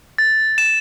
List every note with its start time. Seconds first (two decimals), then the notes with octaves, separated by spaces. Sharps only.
0.18 A6
0.58 E7